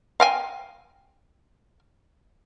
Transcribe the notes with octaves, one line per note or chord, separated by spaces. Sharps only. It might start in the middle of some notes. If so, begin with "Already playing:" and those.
F5 G5 G#5